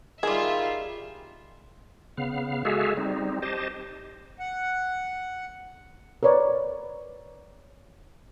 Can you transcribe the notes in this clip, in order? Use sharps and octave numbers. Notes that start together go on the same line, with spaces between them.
D#3 G3 F4 G#4 E5
C#3 B3 F5
G#3 F#4 G#4 A4 E5 F5
G3 C4 D#4
G4 C5 D#5 A5
F#5
A#4 B4 C#5 D5